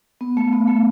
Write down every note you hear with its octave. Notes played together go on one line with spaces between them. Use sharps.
B3
A3
B3
A3